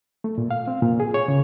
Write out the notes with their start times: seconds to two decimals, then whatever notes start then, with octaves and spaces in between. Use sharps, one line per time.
0.24 A3
0.38 A#2
0.51 F5
0.68 C4
0.83 A#2
1.00 G#4
1.14 C#5
1.28 C#3